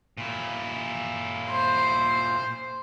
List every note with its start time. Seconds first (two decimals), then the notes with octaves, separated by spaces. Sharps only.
0.18 A#2 E4
1.51 C5